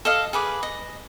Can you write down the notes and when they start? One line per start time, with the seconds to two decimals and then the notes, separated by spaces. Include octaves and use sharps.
0.05 A4 D#5 F5
0.33 G#4 B4 D6
0.63 D#5